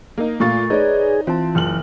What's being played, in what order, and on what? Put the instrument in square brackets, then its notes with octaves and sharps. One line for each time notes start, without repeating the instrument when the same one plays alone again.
[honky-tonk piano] A#3 D#4
[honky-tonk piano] A#2 F4 [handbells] A3 C#6 A6
[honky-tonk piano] D#4 [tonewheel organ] G#4 [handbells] B4 C#5 D5
[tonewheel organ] E3 [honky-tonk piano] C4 [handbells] F4 A5
[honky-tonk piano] F#1 F6 F#7